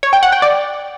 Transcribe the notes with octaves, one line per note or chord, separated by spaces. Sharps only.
C#5
G5
F#5
G5
D5